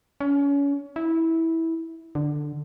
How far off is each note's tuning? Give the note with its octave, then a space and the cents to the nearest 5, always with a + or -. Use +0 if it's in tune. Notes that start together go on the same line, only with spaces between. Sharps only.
C#4 +30
E4 -15
D3 +10